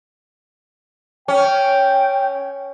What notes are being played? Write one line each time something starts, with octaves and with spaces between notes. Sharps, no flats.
C#4 G5